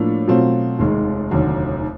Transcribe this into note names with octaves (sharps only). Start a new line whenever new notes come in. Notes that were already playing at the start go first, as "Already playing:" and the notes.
Already playing: A2 F3 A#3 D4
B2 F#3 A3 C4 F4
F1 D#2 D#3 G#3
F1 D#2 D3 F#3